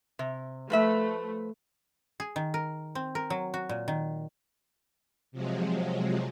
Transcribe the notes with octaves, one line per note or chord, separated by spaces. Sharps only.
C3
F3 A3 B4 E5
G#4
D#3
A#4
C4
A#4
F#3
F#4
A#2
D#3
C3 F3 F#3 G#3